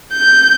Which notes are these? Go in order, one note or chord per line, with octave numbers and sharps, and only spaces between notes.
G6